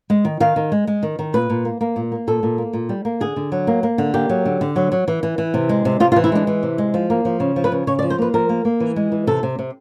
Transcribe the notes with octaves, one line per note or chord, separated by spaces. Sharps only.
G#3
D#3
D#3 F5
D#3
G#3
G#3
D#3
D#3
A#2 B4
A#2
A#3
A#3
A#2
A#3
A#2 A4
A#2
A#3
A#2
G3
A#3
D3 G#4
D3
F#3
A#3
A#3
D3
A#3 G4
F#3
D3
D3
F#3
F#3
E3
E3
E3
C3
G#3
C3
C3 F4
F4
E3
E4
G#3 D4
E3
C3
G#3
F3
A#3
F3
C#3
F3
B4
C#3
C#3 C#5
D5
F3
C5
A#3 B4
F3 A#4
A#3
A#3
E3
G#3
E3
C3 A4
C3
C3